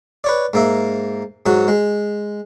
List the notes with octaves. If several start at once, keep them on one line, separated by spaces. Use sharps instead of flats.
B4 C#5 D5
G#2 A#3 E5
G#2 F#3 F#4
G#3